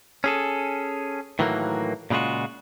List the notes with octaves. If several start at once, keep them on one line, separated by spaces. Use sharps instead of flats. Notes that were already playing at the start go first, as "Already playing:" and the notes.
C#4 G#4 A4
A2 D#3 E3 F#3 A3 A#3
A#2 C#3 G#3 F4 F#4